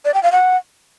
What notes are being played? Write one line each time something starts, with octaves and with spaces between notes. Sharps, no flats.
D5
G5
F5
F#5